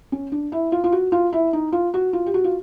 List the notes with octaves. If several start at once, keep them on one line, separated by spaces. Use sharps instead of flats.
C#4
D4
E4
F4
F4
F#4
F4
E4
D#4
F4
F#4
F4
G4
F#4
F4